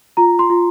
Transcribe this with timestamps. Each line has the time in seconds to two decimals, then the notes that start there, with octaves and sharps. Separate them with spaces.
0.17 F4 A#5
0.39 C6
0.50 F4